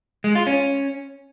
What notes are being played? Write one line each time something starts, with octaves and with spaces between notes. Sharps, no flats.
G#3
F4
C#4